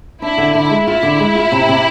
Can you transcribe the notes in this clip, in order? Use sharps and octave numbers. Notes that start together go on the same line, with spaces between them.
D4 E4
D3
D3 E4
G#3
E4 F4
D3
G#3
F4
C3
C3